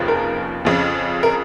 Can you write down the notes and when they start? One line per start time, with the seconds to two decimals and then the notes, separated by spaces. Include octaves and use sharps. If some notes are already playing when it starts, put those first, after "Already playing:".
Already playing: F1 D#2 C#3 F3
0.08 A#4
0.65 F2 C#3 F3
1.23 A#4